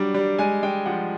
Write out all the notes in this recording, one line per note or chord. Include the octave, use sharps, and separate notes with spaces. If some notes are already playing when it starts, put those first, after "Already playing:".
Already playing: F#3 G3 D4
G3
G#3 G#5
G#3 G5
F3 F#5